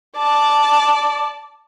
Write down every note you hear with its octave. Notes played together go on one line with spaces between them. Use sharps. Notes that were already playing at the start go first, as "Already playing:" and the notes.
D5 A5